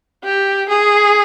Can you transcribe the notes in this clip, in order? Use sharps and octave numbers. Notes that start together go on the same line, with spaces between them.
G4
G#4